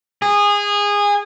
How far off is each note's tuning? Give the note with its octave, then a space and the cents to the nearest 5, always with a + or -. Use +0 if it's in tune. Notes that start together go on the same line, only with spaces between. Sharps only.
G#4 -20